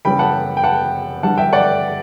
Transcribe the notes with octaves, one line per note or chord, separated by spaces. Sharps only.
F#1 F#2 E3 G3 G5 B5
F#5 A5
G5
F#5 A5
G1 G2 E3 G3 F#5 A5
E5 G5
D5 F#5